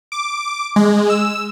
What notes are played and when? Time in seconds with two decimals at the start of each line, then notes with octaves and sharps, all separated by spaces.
0.12 D6
0.76 G#3
1.10 E6